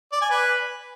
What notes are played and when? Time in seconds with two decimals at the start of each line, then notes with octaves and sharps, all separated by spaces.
0.12 D5
0.22 G#5
0.31 B4